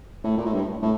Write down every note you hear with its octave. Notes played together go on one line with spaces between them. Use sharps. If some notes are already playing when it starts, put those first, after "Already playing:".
A2
A#2
A2
G2
A2